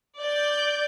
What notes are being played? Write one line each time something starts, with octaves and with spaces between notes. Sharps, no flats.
D5 G6